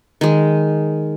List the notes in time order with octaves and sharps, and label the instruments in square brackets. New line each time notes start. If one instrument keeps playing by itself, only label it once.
[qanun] D#3 G#3